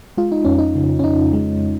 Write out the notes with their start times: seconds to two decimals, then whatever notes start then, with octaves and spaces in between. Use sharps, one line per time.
0.17 G#3 F4
0.32 D#4
0.45 F2 C#4
0.59 D#4
0.75 C#3
0.99 C#4
1.04 F2 D#4
1.33 G#3